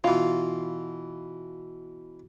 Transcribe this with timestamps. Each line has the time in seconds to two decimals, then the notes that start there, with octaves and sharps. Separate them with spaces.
0.04 B2 E3 F4